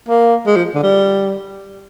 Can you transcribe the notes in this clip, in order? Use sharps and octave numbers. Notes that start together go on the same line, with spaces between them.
A#3
G#3
F3
D3
G3